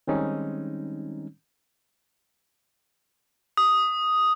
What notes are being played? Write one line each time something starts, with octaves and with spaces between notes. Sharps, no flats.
D#3 G3 G#3 C4 C#4 D#4
D#6